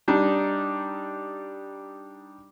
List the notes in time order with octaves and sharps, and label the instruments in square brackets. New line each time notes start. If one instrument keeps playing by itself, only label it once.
[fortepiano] G3 D4 D#4